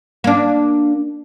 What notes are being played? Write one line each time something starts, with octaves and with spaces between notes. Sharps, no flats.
A#3 D4